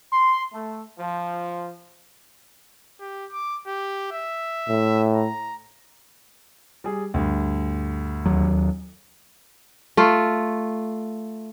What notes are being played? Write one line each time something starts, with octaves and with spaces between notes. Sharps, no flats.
C6
A3
F3
G4
D6
G4
E5
A2
A#5
G3 G#4
D2 G2
D#2 F#3
A3 F4